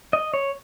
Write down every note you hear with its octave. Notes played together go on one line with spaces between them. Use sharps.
D#5
C#5